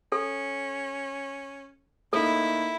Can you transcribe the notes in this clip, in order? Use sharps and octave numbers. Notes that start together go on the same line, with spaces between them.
C#4 A4
A2 A#3 D#4 E4 A4